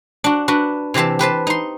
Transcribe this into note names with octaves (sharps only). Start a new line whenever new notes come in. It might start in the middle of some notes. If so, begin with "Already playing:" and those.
D4 F#4
D4 F#4 B4
C3 E3 G4 C5 A5
G4 B4 C5 A5
D#4 C6